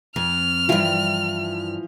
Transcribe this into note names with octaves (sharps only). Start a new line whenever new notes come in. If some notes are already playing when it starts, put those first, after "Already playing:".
F2 F6
G2 E3 F3 E4 F4 G5